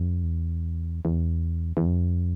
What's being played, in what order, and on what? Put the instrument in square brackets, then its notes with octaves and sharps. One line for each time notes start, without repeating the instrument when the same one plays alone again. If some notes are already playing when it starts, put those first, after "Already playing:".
Already playing: [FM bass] F2
E2
E2
E2
F2